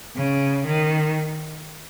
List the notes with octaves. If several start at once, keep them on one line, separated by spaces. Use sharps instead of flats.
C#3
D#3